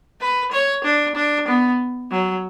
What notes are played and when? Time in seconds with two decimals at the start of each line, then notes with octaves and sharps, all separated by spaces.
0.21 B4
0.52 C#5
0.84 D4
1.15 D4
1.48 B3
2.11 F#3